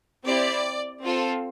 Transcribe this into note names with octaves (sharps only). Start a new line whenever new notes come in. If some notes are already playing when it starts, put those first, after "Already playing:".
C4 E4 G4 D5
C4 F4 A4